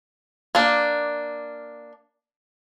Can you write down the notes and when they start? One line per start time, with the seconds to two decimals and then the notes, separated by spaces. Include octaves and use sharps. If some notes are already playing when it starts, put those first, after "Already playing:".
0.55 A#3 D4